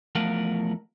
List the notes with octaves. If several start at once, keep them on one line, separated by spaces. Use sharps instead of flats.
E2 F3 A3 A#4 F5 F#5